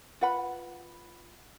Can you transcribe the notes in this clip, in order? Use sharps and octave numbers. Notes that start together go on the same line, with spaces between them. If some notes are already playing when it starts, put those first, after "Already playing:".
F4 B4 F#5 B5